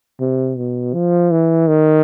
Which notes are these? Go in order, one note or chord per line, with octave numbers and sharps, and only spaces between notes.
C3
B2
F3
E3
D#3